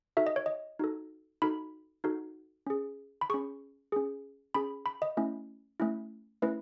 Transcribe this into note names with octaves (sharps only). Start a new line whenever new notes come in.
D#4 F#4 A4 E5
D#5
C#5
D#5
D#4 F#4 A4
D#4 F#4 A4 B5
D#4 F#4 A4
C#4 G#4
B5
C#4 G#4 C#6
C#4 G#4
C#4 G#4 B5
B5
D#5
A3 C#4 E4
A3 C#4 E4
A3 C#4 E4 B4